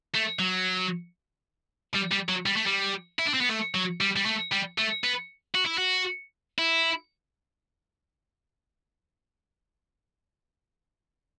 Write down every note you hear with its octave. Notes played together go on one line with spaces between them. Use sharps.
A3
F#3
G3
G3
F#3
G3
A3
G3
E4
D4
C4
B3
A3
F#3
G3
G3
A3
G3
A3
B3
F#4
E4
F#4
E4